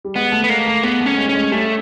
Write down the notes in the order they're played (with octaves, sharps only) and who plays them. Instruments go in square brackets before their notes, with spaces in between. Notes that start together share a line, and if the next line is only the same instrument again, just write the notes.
[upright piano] G3
[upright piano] G#3 [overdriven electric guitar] B3
[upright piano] A3
[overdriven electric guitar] B3
[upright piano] G#3 [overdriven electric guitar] A#3
[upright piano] A3
[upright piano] A#3 [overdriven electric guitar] B3
[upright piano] A3
[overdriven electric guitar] C#4
[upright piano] G#3
[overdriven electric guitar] C#4
[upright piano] G#3
[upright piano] G3 [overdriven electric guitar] A3